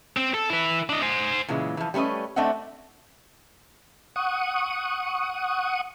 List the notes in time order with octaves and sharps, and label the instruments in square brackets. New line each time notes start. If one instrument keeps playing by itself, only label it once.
[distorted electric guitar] C4
A4
E4 B4
D4 D#5
C5 G#5
[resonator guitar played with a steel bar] A#2 C#3 E3 G#3
E3 F3
G3 A3 C#4 B4 D#5
A3 C4 D4 D#5 E5 F#5
[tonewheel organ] F#5 C#6 D#6